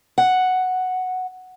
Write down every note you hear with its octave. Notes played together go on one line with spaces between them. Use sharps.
F#5